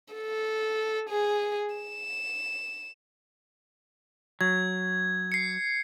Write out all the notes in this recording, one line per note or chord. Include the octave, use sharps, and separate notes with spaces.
A4
G#4
E7
F#3 G#6
C7 C#7